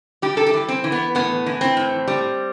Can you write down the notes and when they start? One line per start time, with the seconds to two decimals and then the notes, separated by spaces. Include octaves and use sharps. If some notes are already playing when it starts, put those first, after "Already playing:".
0.22 G3 G4
0.37 A4
0.46 G4
0.53 E3
0.69 C4
0.84 E3
0.92 B3
1.15 A2 B3
1.46 E3
1.61 C4
1.77 A2
2.07 G3